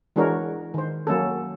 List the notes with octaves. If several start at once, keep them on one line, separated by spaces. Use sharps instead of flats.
E3 G#3 D4 F#4 A#4 C#5
D#3 C5
F#3 A#3 C#4 A4